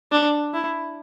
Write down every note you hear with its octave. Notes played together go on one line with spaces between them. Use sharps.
D4
E4